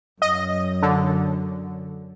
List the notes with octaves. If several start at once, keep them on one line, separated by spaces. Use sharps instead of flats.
F#2 D#5
D3